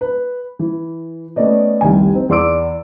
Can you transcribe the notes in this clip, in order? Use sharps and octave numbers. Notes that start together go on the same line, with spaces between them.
B4
E3
A3 B3 C#4 D5 D#5
F1 C2 D#3 G#5
C4 D#4
E2 D5 C6 D6 E6 D7